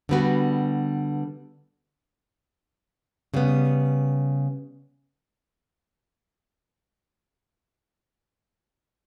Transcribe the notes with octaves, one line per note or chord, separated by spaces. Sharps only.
D3 G3 B3 F#4 B4
C#3 G3 B3